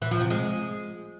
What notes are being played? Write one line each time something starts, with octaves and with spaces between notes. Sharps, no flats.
E3
F3
C3
G#3